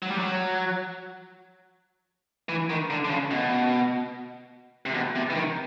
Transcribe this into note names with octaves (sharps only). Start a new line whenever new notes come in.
F#3
G3
F#3
E3
D#3
D3
D3
C#3
B2
C3
B2
C3
E3
D#3